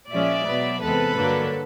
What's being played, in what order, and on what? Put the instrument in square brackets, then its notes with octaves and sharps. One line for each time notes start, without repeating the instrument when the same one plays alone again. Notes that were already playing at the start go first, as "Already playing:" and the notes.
[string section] A#2 F3 G#3 C#4 D5 E5
B2 F#3 B3
E2 C3 E3 G#3 B3 A4 B4
G2 D3 F#3 A#3 D4